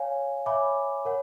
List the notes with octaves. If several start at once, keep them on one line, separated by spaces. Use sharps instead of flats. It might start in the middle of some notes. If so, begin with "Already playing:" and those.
Already playing: C#5 F5 G#5
C#5 E5 G#5 B5 D6
A#4 C#5 F#5